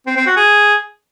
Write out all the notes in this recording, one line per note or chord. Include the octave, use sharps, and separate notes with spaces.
C4
C4
F#4
G#4